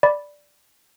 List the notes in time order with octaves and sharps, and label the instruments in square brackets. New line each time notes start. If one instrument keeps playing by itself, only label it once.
[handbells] D5 B5